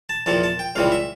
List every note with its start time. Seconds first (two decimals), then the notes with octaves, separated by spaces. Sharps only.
0.09 A5
0.26 E2 C3 F3 A#3 A5
0.43 A5
0.59 G5
0.75 C#2 C3 E3 G3 F5
0.92 E5